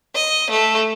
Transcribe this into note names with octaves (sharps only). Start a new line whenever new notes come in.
D#5
A3